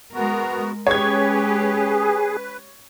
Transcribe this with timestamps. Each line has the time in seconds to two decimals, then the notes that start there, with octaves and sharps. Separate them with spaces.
0.14 G#3 B3 F#4 A#4
0.87 G#3 C#4 G4 G#4 B4 C#5 G#6